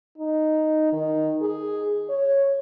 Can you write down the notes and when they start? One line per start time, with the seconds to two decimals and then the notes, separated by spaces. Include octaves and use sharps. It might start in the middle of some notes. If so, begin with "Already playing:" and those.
0.18 D#4
0.93 D#3
1.42 G#4
2.09 C#5